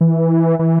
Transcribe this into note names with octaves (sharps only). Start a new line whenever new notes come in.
E3
E3